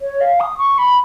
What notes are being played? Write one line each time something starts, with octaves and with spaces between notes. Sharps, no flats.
C#5
F5
D#6
C#6
B5